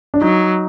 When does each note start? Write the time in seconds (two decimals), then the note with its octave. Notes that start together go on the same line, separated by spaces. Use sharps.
0.14 D4
0.21 F#3 D#4